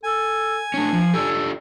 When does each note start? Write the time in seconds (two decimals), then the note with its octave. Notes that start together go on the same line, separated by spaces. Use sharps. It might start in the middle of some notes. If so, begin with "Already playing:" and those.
0.03 A4 G#5
0.74 A3 C#4 D4
0.93 F3
1.14 D4 F4 G4 A4